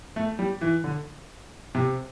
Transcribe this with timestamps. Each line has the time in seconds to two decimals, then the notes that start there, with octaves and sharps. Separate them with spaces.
0.16 A3
0.39 G3
0.61 E3
0.84 D3
1.75 C3